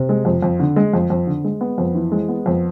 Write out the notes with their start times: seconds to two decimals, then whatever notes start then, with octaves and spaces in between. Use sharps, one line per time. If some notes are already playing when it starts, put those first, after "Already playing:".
Already playing: C3
0.09 G#3
0.25 F2
0.42 F2
0.59 D3
0.76 G#3
0.94 F2
1.10 F2
1.27 D3
1.44 G#3
1.61 B3
1.78 F2
1.95 E3
2.12 G#3
2.28 B3
2.46 F2